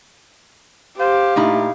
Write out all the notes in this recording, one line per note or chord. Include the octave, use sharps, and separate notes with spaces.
G4 C5 F5
A#2 A3 D#4 E4